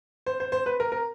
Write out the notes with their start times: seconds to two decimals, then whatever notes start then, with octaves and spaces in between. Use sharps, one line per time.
0.26 C5
0.40 C5
0.52 C5
0.66 B4
0.80 A#4
0.92 A#4